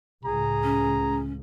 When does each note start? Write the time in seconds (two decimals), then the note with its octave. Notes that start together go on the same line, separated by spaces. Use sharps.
0.25 C#2 A2 G#4 A#5
0.64 C#4